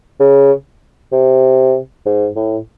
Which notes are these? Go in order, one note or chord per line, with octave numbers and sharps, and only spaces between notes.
C#3
C3
G#2
A2